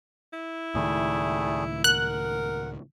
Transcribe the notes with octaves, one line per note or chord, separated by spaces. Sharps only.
E4
C#2 A2 D#3 G3 A3 G#4
A#4 F#5 F#6